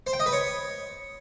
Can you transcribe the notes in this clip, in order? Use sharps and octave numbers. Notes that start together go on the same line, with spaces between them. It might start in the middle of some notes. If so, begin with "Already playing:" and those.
C5
G5
D#5
B4
C#5